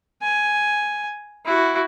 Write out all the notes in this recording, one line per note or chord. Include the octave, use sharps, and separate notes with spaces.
G#5
E4 F#4